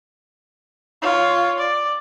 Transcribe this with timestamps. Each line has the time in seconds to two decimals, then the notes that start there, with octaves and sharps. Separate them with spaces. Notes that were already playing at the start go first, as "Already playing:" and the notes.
1.02 F4 C#5
1.58 D5